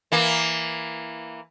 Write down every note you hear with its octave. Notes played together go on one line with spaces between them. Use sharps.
E3 A#3